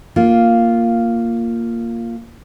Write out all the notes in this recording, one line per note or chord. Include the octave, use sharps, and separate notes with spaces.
A#3 F4